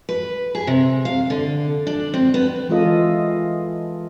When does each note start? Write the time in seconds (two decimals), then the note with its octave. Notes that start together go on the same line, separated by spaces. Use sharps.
0.09 B4
0.55 G#4
0.67 C3
1.05 F5
1.30 D3
1.87 D4
2.14 C4
2.34 B3
2.69 E3 G#3 F4 A4 D#5